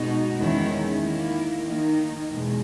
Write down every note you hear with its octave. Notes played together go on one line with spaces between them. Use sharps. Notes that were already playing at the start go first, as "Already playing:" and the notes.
Already playing: B2 G#3 D#4 F#4
E2 D#3 G#3 C#4 E4
D#3 A#3 E4
D#3 A#3 D#4
E2 B2 G#3